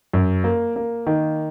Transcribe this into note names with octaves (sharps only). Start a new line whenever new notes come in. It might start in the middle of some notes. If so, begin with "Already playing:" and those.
F#2
A#3
A#3
D#3